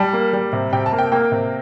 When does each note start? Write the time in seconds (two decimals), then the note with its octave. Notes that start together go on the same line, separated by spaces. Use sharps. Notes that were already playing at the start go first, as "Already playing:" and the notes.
Already playing: G3 A5
0.13 A#3
0.33 G3
0.53 C3
0.72 C3 G5
0.86 A5
0.92 A#3
0.99 G5
1.12 A#3 G5
1.32 C3